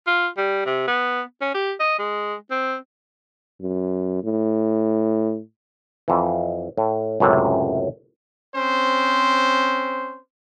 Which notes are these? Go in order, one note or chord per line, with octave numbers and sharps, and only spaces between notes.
F4
G3
C3
B3
C#4
G4
D#5
G#3
C4
F#2
A2
F2 E3
A2
C#2 F#2 A2 C3
C4 C#4 C5